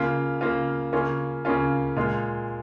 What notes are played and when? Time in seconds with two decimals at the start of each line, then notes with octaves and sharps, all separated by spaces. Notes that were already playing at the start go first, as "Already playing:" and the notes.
Already playing: C#3 A#3 F4
0.41 C#3 A#3 F4
0.93 C#3 A#3 C#4 F4
1.45 C#3 A#3 C#4 F4
1.96 A#2 G#3 F4